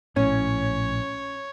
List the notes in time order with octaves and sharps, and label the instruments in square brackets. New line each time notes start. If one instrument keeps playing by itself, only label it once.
[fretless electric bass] A#1 A2 [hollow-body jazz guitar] C#4 [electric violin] C#5